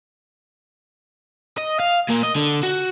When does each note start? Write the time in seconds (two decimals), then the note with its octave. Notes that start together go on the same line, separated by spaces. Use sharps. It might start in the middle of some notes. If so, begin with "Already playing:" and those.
1.58 D#5
1.80 F5
2.09 A#2 A#3
2.23 D#5
2.36 D3
2.63 F#4